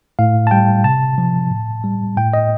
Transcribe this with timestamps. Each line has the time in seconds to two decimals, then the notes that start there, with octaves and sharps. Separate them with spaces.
0.19 A2 F5
0.47 A5
0.51 G3 G5
0.84 C3 A5
1.18 F3
1.51 A2
1.84 G3
2.17 A2 G5
2.33 D#5